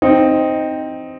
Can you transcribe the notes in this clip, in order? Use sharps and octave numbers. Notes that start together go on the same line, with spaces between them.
C4 D#4